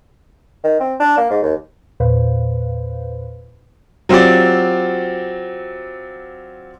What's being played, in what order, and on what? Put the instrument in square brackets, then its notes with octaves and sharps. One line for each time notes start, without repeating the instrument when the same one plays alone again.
[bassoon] D#3
C4
D4
A#3
G#2
D#2
[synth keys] E2 A#2 B4 C5 F5
[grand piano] F#3 C4 F4 G4 D5